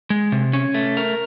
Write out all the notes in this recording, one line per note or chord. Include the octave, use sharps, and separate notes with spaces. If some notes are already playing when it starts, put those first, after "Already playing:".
G#3
C3
C#4
A3
A#4